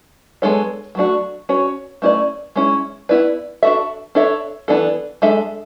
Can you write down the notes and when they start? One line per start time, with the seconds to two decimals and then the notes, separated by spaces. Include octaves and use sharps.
0.42 G#3 B3 D4 A4 C#5
0.95 F#3 A3 D4 F#4
1.49 C#4 F#4 C#5
2.02 A3 C#4 E4 A4 D5
2.56 G#3 C#4 E4
3.09 B3 E4 B4 D5
3.63 D4 F#4 A4 E5
4.15 D4 A4 C#5 E5
4.68 E3 B3 D4 A4
5.22 G#3 D4 A4 E5